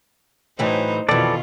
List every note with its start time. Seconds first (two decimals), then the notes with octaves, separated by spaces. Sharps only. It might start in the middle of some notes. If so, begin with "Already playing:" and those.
0.59 A2 E3 F#3 D#4 C5
1.09 F2 B2 D#3 E3 F4 A4 D5